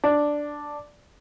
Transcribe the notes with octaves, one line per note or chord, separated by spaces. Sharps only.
D4